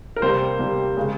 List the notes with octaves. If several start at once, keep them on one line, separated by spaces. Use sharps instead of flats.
A#4
C3 G3 A#3 C5
C3 G3 A#3
C#3 G#3